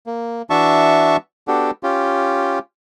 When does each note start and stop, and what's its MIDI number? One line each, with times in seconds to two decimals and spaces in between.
0.07 0.42 58
0.50 1.17 52
0.50 1.17 62
0.50 1.17 66
0.50 1.17 76
0.50 1.17 81
0.50 1.17 85
1.48 1.71 59
1.48 1.71 62
1.48 1.71 66
1.48 1.71 67
1.48 1.71 69
1.83 2.59 61
1.83 2.59 65
1.83 2.59 67